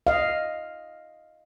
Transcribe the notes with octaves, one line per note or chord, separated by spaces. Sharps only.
D#5 F5